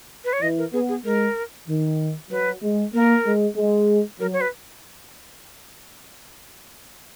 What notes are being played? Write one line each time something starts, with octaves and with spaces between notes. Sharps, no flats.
B4
C#5
E3 D#5
A#4
B3 G#4
G#4
G#3 A#4
D#3
F#3 B4
G#3
A#3 A#4
G#3
G#3
F#3 A#4
C#5
B4